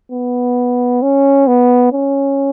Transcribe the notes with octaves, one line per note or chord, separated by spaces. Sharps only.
B3
C#4
B3
C#4